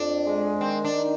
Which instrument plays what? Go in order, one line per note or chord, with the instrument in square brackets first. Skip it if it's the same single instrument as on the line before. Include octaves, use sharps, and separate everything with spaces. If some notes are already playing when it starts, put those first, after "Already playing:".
Already playing: [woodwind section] F2 [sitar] D4
[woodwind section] G#3
[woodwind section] D#3 [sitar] C4
[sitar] D4
[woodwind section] D#4